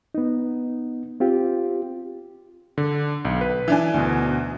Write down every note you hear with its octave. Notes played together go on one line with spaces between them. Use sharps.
B3 D#4
C4 F4 G4
D3
B1
B4
E3 D4 G#5
D2 B2